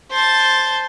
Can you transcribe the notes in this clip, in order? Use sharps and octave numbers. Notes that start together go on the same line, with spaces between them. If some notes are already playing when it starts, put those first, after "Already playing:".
C5 A5